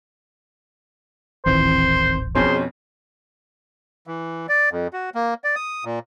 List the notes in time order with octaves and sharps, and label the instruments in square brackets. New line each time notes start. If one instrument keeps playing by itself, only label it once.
[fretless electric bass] D#1 A1 [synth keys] D#3 E3 C4 [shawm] C5
[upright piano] F2 B2 C#4 [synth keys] G#4 [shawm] C5
[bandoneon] E3
D5
F2
F#4
A#3
D5
D#6
A#2